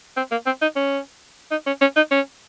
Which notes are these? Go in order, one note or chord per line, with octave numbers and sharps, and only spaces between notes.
C4
A#3
C4
D#4
C#4
D#4
C#4
C#4
D#4
C#4